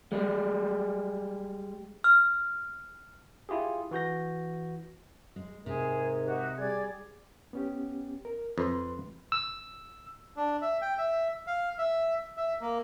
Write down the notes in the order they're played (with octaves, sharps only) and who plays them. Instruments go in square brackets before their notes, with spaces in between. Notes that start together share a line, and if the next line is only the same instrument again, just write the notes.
[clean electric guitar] G3 G#3
[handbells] F6
[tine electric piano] E4 F4 G4 G#4
E3 F#4 G6 A#6
[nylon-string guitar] G#3
[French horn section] G#2 A#4 [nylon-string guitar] C3 [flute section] G#4
[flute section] D#4 F#4 G4
[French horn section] G3 G#4 [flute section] D5 G#6
[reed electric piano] B3 C#4 G4
A#4
[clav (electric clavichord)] F2 [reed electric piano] B4 B5 C6
[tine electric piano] E6
[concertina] D4
E5
G5
E5
F5
E5
E5
A#3